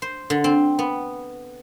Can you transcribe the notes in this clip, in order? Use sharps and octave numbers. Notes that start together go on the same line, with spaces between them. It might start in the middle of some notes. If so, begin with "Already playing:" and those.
C5
D3
C4
B3